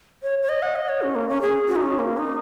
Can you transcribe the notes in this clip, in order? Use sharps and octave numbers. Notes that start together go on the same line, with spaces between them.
C#5
C#5
D#5
F#5
D#5
C#5
C#4
A#3
C#4
G#4
F#4
D#4
C#4
A#3
D#4